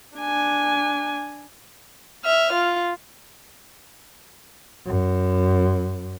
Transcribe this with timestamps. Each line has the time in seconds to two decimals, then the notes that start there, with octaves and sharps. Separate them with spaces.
0.17 D4 G#5
2.24 E5 F6
2.53 F4
4.86 F#2